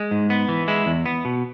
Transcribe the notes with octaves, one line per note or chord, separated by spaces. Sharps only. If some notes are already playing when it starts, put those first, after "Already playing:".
Already playing: G#3
G#2
B3
E3
G#3 E4
E2
B3
B2